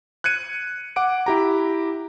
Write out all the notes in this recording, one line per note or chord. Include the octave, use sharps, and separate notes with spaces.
F#6 G#6 C#7 D#7
F#5 D6 D7
E4 G4 A#5